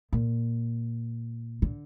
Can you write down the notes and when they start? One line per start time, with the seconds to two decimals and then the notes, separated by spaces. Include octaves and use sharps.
0.13 A#2
1.62 D3